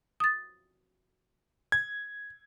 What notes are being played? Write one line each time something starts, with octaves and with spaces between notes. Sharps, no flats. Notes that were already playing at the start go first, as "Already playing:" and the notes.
D#6 A6
G#6